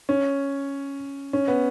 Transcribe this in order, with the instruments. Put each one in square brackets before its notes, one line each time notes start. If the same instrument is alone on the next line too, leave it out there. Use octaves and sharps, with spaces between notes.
[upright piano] C#4
C#4
B3